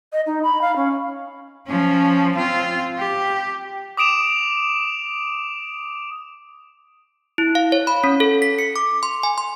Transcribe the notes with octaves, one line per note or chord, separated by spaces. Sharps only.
D#5
D#4
B5
F5
C#4
F3 C#4
C4 F4
G4
D6 D#6 D7 E7 F7
E4
F5
C#5
B5
C#4
A4
B6
C#7
D6
C6
G#5
C6